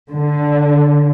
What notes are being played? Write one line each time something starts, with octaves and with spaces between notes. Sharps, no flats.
D3